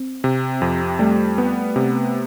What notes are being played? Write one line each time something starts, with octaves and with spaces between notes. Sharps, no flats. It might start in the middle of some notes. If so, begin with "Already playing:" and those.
Already playing: C4
C3
F2
G3 A3
B3
C3